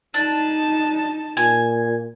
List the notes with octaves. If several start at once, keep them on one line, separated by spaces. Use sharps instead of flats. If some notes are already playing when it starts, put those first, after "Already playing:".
D4 D#4 A5
A#2 G#5